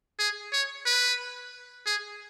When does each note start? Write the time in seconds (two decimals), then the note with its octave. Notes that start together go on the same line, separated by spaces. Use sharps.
0.19 G#4
0.53 C#5
0.86 B4
1.86 G#4